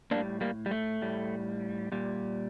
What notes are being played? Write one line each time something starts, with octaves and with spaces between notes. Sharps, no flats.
A2 G3 A#3 D4
G3 A#3
G3
A3
A2 G3
A#2 G3